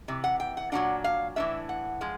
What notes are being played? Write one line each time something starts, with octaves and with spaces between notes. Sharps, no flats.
C3 E3
F#5
G5
F#5
A#2 F#3 A#3 D4 F#5
F5
A2 E3 A3 D4 E5
F#5
F3 G#3